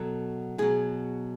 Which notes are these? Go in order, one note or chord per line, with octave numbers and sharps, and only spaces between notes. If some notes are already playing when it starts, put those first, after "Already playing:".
Already playing: B2 F#3 A4
B2 F#3 G#4